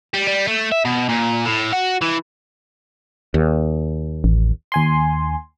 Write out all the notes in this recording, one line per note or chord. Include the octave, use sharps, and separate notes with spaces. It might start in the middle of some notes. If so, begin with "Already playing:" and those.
G3
G3
A3
E5
B2
A#2
A2
F#4
E3
D#2
A1
D#2 G#5 C6